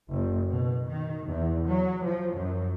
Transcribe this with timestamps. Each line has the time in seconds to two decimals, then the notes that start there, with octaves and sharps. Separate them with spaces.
0.11 F#1
0.48 B2
0.89 D#3
1.29 E2
1.68 F#3
2.07 F3
2.36 F#2